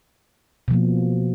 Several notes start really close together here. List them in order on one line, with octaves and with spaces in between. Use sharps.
B2 F3 A#3